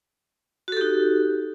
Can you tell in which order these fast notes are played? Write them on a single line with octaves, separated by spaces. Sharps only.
F#4 A4 G4 D#4